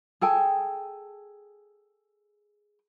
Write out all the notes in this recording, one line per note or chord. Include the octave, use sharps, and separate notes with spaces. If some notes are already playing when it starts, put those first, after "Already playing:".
G#4 A4 G5 G#5